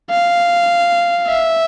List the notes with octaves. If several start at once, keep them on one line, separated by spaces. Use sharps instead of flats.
F5
E5